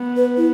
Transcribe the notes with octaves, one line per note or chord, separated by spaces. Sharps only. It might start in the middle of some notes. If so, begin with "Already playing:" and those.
Already playing: B3
B4
E4